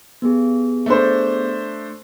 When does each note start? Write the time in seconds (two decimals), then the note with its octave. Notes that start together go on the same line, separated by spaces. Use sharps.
0.22 B3 G4 G#4
0.86 A3 D4 C5